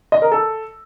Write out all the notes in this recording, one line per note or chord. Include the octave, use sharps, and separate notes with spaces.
D#5
A#4
A4